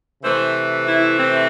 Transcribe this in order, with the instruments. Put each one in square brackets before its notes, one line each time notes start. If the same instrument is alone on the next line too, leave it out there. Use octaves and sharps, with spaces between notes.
[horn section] C3 E3 A3 C5
E4
C4